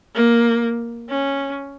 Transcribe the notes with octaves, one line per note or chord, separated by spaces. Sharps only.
A#3
C#4